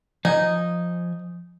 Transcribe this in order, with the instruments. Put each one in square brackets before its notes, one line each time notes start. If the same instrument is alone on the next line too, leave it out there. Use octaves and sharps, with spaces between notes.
[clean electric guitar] F3 G#5 [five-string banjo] D#4